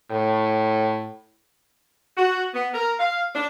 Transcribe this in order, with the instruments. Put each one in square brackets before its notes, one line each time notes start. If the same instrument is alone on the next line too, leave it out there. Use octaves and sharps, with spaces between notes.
[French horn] A2
[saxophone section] F#4
B3
A#4
F5
D4